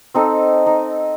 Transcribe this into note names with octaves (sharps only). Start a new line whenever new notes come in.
C4 D#4 A4
D#4